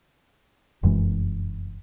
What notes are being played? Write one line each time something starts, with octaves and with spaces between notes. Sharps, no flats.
F1 F#2 E3 G#3